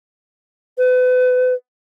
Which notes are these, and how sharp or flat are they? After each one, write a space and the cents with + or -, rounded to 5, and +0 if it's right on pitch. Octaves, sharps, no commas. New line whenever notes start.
B4 +35